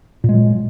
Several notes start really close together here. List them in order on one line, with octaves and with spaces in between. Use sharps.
A#2 G#3 F#3